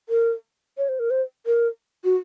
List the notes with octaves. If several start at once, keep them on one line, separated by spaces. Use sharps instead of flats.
A#4
C#5
C5
A#4
C5
A#4
F#4